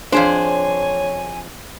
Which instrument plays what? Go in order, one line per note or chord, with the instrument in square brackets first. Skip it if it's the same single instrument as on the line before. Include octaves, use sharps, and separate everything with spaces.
[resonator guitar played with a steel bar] F2 G#4 C5 [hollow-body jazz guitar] D4 [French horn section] C#5 [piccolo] G#5